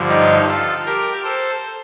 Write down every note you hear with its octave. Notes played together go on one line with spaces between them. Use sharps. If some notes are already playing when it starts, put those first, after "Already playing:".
Already playing: G2 D3 F3
D#4 G4
F4 A4
G4 A#4
A4 C5